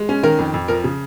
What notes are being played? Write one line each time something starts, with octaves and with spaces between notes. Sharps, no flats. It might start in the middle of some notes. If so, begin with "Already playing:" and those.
Already playing: G#3
C#4
D#3 A#4
F2
F2
F3 A#4
C#3